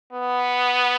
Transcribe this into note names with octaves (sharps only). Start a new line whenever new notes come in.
B3